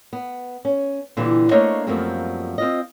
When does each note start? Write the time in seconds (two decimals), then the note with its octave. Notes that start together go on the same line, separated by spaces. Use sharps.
0.13 B3
0.65 C#4
1.17 A#2 D3 E3 G3
1.51 A3 A#3 D4 C5 C#5 D#5
1.87 F#2 F3 G3 A3 A#3 C4
2.58 C4 F4 D#5